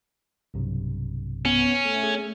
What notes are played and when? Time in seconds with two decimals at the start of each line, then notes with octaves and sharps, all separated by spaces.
0.54 B1 G2 C3
1.45 B3 C#4
1.85 A3
2.03 G#4